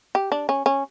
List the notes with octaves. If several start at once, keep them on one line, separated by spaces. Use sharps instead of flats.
G4
D4
C#4
C#4